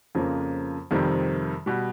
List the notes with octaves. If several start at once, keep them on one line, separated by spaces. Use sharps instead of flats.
F2 C#3 F3 A#3
F2 C3 D#3 G3 C4
B2 G3